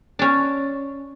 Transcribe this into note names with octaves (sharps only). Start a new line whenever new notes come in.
C#4 D4